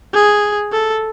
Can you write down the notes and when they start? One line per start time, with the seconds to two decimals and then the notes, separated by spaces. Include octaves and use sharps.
0.14 G#4
0.72 A4